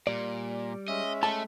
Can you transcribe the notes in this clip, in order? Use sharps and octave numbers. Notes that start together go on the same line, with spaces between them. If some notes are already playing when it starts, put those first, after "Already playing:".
A#2 G3 D5
G#3 C#4 D#5 E5
A3 A5